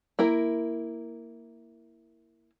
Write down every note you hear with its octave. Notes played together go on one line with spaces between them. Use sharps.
A#3 E4 A#4